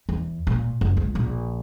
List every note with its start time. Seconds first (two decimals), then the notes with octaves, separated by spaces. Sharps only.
0.09 E2
0.47 A#2
0.81 F#1
0.97 C#2
1.15 A#1